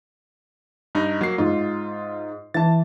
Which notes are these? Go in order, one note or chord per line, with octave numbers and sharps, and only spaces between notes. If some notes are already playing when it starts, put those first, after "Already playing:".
G2 D#4
F#3 A#3 C7
G#2 F4
E3 A5 A6